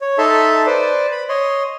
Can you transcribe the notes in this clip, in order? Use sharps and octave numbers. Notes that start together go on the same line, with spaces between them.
C#5
D#4 A4 E5 A5 C6
B4 C5 D5
B5
C#5 D#5 C6